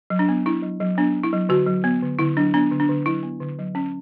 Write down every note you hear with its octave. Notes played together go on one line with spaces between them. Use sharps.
F#3
D4
B3
D4 E4
F#3
F#3
B3 D4
D4
E4
F#3
D3 F#4
F#3
B3
D3
D3 E4
F#3 D4
B3 D4
D3
D4
D3
F#3 E4
B3
D3
F#3
C#4